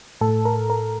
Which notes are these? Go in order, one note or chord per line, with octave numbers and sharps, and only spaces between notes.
A2 A4
A#4
A#4